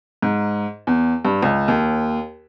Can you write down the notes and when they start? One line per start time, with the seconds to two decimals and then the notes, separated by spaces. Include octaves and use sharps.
0.22 G#2
0.87 E2
1.25 G2
1.43 C#2
1.68 D#2